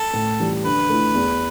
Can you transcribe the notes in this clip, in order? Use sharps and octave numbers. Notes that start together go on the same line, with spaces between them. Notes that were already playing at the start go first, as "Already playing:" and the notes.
Already playing: A4
A2
E3 G3
D3 B4
A3 E4
E2